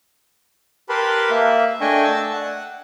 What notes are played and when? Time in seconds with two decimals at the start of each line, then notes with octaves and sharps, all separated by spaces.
0.89 G4 A#4 B4 A5 B5 C6
1.31 A#3 E5
1.81 A3 D4 D#5 G5 G#5 C#6
2.04 A5 E6
2.33 F#5